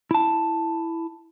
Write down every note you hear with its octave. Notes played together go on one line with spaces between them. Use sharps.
E4 A5